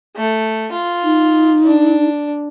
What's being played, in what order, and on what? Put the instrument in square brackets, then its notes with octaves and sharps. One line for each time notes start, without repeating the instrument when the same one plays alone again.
[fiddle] A3
F4
[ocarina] D#4
[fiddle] D4